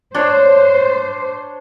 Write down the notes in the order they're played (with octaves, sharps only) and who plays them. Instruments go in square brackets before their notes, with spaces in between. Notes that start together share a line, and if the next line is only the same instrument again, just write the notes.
[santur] D4 C#5 [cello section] C5